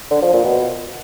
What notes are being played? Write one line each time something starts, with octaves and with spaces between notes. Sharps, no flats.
D3
F3
A#2
B2